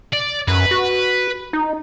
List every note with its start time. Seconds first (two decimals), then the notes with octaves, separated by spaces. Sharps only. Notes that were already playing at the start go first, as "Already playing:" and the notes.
0.13 D5
0.48 F#2 B4
0.71 F#4
1.53 D#4